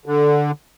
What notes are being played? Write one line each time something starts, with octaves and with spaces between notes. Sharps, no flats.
D3